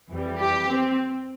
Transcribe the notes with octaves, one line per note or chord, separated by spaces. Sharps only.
F2 E3 G3
G4
C4